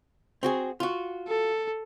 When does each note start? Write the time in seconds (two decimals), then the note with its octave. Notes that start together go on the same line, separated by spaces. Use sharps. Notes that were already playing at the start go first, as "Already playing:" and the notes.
0.43 C4 F#4 G#4
0.80 F4 F#4
1.28 A4